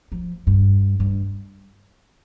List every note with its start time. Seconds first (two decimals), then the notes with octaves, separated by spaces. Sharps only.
0.12 F3
0.47 G2
1.00 G2